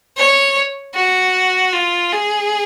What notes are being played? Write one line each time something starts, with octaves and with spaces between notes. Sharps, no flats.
C#5
F#4
F4
G#4